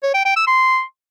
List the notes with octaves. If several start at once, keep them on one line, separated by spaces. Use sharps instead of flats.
C#5
G5
G5
E6
C6